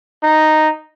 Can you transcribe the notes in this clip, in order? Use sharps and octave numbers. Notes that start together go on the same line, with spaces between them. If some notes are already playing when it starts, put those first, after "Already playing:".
D#4